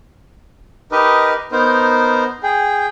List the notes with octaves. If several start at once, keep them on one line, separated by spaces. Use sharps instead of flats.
D#4 G4 A#4 B4 D#5
B3 D#4 A#4 C5
G#4 G5